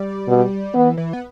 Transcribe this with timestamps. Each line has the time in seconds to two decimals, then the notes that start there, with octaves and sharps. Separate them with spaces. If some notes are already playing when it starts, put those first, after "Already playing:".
Already playing: G3
0.28 B2
0.74 E3 B3
0.97 E3
1.13 B3